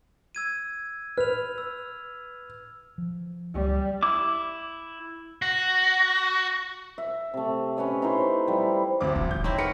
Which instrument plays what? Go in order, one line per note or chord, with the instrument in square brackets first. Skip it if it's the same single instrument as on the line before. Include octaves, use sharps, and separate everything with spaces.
[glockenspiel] E6 G#6 D#7
[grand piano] B4 [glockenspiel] F6 F7
[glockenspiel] E6
[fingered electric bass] F3
[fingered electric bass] C#2 [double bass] G3
[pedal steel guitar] E4 D6
[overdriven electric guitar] F#4
[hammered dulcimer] E5
C3 A3
C#4 B4 C#5 D#5
D#4 E4 B4 C5
F3 G3 E4
[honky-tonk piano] D2 C4 D6
[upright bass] D#1 F3
[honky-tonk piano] G6
[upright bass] E2 [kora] C4 D#4 E4 [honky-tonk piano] C#5
[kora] F#4 A#4 B4 [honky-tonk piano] C#7